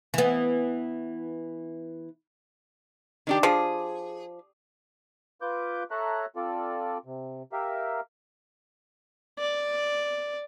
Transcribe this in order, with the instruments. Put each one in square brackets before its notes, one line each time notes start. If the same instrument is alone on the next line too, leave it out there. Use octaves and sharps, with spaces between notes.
[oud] E3 B3
[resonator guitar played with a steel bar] D#3 D4 G4
[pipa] F3 [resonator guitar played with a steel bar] G#4
[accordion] F4 B4 D6 G6
A4 C#5 E5 A#5 F#6
C4 F4 A4 D5
C3
G4 A#4 E5 F5
[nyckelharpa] D5